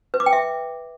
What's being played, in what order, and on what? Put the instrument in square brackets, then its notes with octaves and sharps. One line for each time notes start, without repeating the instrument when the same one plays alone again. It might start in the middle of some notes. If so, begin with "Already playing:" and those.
[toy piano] B4
D6
G5
E5